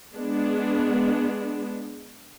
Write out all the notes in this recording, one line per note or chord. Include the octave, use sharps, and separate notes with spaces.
G#3 B3 D4